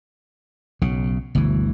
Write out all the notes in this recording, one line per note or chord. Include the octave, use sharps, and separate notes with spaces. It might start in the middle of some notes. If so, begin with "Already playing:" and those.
B1 C#3
G1 D2 B2 E3